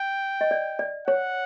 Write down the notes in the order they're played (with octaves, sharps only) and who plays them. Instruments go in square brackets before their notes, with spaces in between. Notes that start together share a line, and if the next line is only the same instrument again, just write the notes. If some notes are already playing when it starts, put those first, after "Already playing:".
Already playing: [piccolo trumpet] G5
[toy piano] D#5
D5
D5
[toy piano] C#5 [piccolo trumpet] F#5